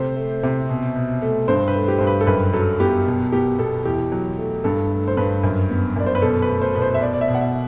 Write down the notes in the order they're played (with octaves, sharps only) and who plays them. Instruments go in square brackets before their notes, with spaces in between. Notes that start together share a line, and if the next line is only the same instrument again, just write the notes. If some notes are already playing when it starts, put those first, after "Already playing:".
Already playing: [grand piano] C3 A3 C5
A3
C3
B2
B2
A3
G2 C5
B4
A3
G4
G2 C5
B4
A4
F#2 B4
F#3 A4
B3 G4
B2
B3 G4
B2 A4
E2 G4
F#3
A3
G2 A4
A3
C5
G2 B4
F#2
B3
F#2 D5
C5
B4
B2 A4
B4
A3
C5
B2 B4
C5
E5
B2 D5
D5
E5
B2
F#5
E5